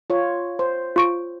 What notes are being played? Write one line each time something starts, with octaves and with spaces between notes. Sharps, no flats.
F4 C#5
C5
F4 C#6 D7